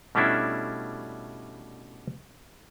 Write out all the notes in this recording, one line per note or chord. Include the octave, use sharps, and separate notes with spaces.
B2 G3 A3 C#4 D4 E4